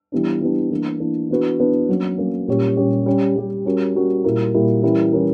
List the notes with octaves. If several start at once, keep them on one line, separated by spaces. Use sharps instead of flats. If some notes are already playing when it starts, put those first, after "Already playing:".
E3 G3 B3 D4
E3 G3 B3 D4
E3 A#3 D4
E3 A#3 D4
E3 B3 D4 F#4 B4
E3 B3 D4 F#4 B4
F#3 A#3 C#4
F#3 A#3 C#4
A#2 G3 C#4 G4 C#5
A#2 G3 C#4 G4 C#5
G3 C#4 G4
G3 C#4 G4
G3 C#4 F#4 A#4
G3 C#4 F#4 A#4
A#2 G3 A#3 E4 A#4
A#2 G3 A#3 E4 A#4
E3 G3 C#4 E4 A#4
E3 G3 C#4 E4 A#4